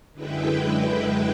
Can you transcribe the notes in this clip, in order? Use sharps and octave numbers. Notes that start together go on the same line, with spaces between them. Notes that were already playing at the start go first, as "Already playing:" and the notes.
F#2 D3 G#3 E4 B4 G5